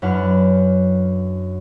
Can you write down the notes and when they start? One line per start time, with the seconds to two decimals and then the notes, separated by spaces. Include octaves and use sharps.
0.02 F#2 D4 E4 B4 F#5 F6